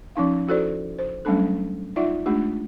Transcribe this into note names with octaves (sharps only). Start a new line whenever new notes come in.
F3 C#4 D#4 F5
E4 F#4 A4 C5 D5
C5
F#3 G3 A3 C#4 D4 A4
D#4 F4 D5 E5 F#5
G#3 A3 D4 F4 G4